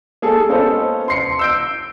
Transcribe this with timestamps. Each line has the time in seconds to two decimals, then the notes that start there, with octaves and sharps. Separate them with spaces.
0.22 A#3 G#4 A4
0.49 B3 C#4 F4 A4 C5 D#5
1.08 C6 C7 C#7
1.39 E6 G6 D7